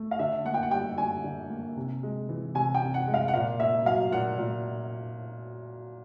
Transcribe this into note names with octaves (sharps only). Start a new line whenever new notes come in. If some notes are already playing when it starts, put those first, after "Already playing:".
Already playing: A3
F5
D3 E5
A#3 F#5
G5
F#5
G3 G5
D3 G#5
D3
A#3
C3
G#3
E3
C3 G#5
G5
C3
F#5
G#3
F5
F#5
A#2 F5
A#3 E5
F#3 F5
A#2 F#5
A#2